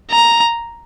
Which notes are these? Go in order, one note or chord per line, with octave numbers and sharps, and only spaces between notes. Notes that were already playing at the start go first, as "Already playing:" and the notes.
A#5